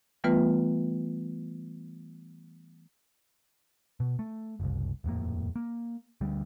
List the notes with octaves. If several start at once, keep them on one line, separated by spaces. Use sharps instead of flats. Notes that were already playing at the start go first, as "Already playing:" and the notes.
E3 G3 A3 B3 F4 B4
B2
A3
F#1 C2
D#1 F2 A2 A#3
A#3
D2 G3